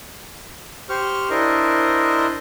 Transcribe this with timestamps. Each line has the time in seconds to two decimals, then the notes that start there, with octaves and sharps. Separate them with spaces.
0.90 G4 C5 C#6 F6
1.31 D4 E4 A#4 C5 D#5